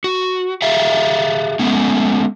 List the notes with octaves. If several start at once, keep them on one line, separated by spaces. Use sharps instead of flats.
F#4
G4 G#4 E5 F5
G#3 A3 B3 C#4